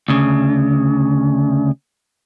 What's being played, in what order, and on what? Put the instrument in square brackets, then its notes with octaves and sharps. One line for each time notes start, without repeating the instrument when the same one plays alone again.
[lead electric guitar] D2 C#3